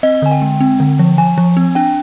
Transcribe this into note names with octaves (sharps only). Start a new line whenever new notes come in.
C4 D#5
D3 G#5
G5
G#3
C4
D3
F3
F3 G#5
F3
C4
D4 G5